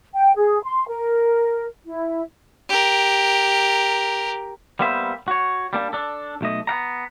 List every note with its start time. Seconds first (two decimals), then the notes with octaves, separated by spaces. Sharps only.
0.15 G5
0.37 G#4
0.64 C6
0.88 A#4
1.86 E4
2.69 G4 A#4
4.79 G3 A#3 B3 C5 E5
5.28 F#4 C#5
5.73 G3 A#3 D4
5.93 D4 A4
6.41 B1 A3 D#5
6.67 B3 F#5 A#5